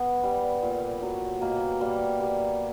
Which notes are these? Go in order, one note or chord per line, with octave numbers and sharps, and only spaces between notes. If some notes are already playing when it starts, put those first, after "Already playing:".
Already playing: B3
G3
A#2
F#3
B2 A#3
G3 A#3
G3